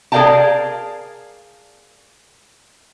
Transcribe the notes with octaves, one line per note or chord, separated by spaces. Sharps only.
G#4 A#4 D5 F5 G5 A5